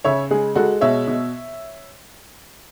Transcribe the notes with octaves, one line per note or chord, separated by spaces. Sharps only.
C#3 C#5 E5
G#3 G#4
G#3 F#4 A4
B2 C#5 E5
B2